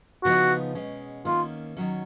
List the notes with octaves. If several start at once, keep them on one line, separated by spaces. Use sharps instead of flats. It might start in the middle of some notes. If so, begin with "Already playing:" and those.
C#3 F3 B3 D#4 F#4
B2 G#3 C#4
D#3 A#3 C#4 F4
D#3 F#3 C#4